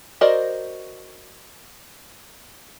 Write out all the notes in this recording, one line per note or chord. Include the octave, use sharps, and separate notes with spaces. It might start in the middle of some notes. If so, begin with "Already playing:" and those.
F#4 A#4 C5 D5 D#5